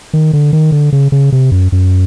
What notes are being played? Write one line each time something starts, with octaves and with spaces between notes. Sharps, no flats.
D#3
D3
D#3
D3
C#3
C#3
C3
F#2
F#2